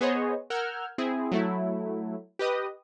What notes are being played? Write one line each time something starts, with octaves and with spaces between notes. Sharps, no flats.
B3 G#4 C5 C#5 D#5
A#4 F#5 E6 F6 G6 G#6
C4 E4 G#4
F#3 A3 E4
G4 B4 D#5 D#6